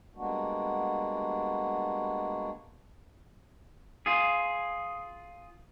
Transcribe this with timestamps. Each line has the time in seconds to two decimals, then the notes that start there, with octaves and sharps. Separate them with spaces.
0.15 G3 G#3 A#3 B3 D4 F#4
4.06 F4 G#4